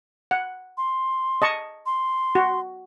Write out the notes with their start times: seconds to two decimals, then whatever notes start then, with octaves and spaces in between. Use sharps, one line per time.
0.31 F#5
0.78 C6
1.42 D#5 A5 C#6
1.86 C6
2.35 F#4